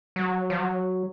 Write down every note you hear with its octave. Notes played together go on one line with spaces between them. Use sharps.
F#3
F3
F#3